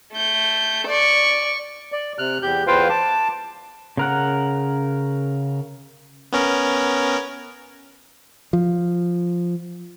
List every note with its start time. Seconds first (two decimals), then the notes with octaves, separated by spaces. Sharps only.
0.14 A3 G6
0.88 D5 C#6
1.92 D5
2.19 C3 F6 F#6
2.42 E2 G4 G6
2.67 E2 F4 B4 C5 F5 G5
2.90 A5 D6
3.97 C#3 A#4 F#5
6.32 B3 C#4 A#4
8.53 F3